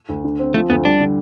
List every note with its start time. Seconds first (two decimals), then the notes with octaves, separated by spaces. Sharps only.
0.09 D2
0.24 D3
0.39 C4
0.54 F3 A3
0.70 D2 B3
0.85 G3 D4
1.00 D3